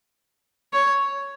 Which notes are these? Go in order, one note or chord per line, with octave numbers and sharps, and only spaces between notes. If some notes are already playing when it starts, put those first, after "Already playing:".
C#5